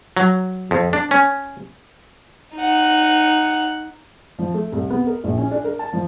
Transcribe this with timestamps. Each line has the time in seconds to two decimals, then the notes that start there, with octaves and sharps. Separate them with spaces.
0.17 F#3
0.71 F2
0.93 D4
1.11 C#4
2.56 D#4 F#5
4.38 F3
4.54 A3
4.72 C2
4.90 B3
5.07 A#4
5.24 A#1
5.38 C#4
5.51 D4
5.64 A#4
5.79 A5
5.93 F3